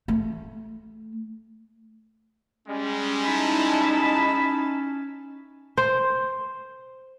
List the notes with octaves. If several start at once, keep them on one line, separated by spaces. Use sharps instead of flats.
A3
G3 G#3 C#4
D#4 E4 A5 B5
C5